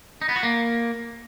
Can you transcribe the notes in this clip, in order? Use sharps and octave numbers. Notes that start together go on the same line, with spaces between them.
D#4
B3
F#4
A#3